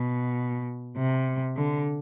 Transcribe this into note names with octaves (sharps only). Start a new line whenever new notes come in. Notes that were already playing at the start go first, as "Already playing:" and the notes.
Already playing: B2
C3
D3